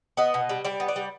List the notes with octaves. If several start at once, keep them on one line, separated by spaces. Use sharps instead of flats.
B3 D#5
B2
G3
G3 D5
B3
D5
G3